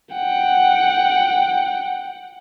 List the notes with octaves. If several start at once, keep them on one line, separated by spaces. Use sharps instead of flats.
F#5 G5